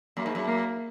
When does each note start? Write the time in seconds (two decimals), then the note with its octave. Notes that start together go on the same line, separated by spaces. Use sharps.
0.17 F#2 A#3
0.26 G#2
0.35 F#2
0.47 A#3